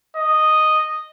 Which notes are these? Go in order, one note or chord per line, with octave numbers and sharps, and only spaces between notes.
D#5